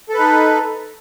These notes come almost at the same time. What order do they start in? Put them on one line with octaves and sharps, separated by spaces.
A4 B4 D#4